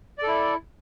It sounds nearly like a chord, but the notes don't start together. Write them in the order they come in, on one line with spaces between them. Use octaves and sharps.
D5 A4 E4